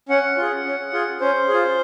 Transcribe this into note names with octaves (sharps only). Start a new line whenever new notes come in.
C#4 F#5
F4 G#4
C#4
F4 G#4
C#4 C5
G#4
F4